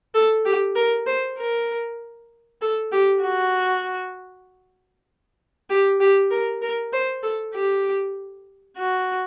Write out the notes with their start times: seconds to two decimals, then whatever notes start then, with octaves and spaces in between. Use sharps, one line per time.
0.14 A4
0.45 G4
0.75 A#4
1.07 C5
1.38 A#4
2.61 A4
2.92 G4
3.22 F#4
5.70 G4
6.00 G4
6.31 A#4
6.62 A#4
6.93 C5
7.23 A4
7.54 G4
8.78 F#4